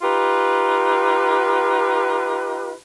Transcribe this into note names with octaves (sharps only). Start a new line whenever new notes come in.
D#4 F4 G4 B4